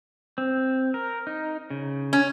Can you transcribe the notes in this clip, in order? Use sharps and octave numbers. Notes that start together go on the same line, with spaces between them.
C4
A#4
D#4
C#3
C#4